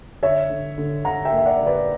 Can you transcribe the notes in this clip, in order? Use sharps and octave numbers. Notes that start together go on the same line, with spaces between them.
D3 C#5 E5
D3
D3
D3 F#5 A#5
E5 G5
A#3
E5
D5 F#5
D3
B4 D5